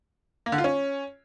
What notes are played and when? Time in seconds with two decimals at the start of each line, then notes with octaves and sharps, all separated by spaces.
0.46 A#3
0.52 D3
0.58 F4
0.64 C#4